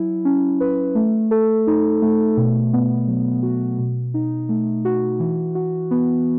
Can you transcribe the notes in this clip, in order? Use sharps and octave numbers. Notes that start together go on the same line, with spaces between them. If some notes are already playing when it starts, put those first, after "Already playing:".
Already playing: F#3 E4
C#4
B4
A3
A4
D#4
A3
B2
B3
F#3
F#4
B2
D#4
A3
F#4
E3
F#4
B3